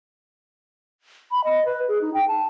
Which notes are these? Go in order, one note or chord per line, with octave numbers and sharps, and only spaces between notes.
B5
D#5
B4
G#4
D#4
G5
A5